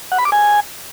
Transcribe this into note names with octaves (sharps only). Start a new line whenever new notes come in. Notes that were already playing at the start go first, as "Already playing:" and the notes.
F#5
B5
D6
G#5